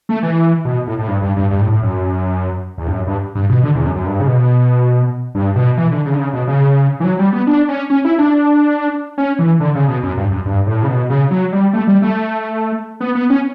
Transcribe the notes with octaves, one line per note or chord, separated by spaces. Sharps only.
A3
E3
B2
A2
A2
G2
G2
G2
G2
A2
A2
F#2
E2
G2
F#2
G2
G2
B2
D3
E2
F#2
F#2
G2
C#3
B2
G2
B2
E3
D3
C#3
D3
C#3
B2
C#3
E3
F#3
G3
B3
D4
C#4
C#4
E4
D4
C#4
E3
D3
C#3
B2
F#2
G2
F#2
G2
A2
C#3
B2
C#3
F#3
G3
A3
G3
A3
B3
B3
C#4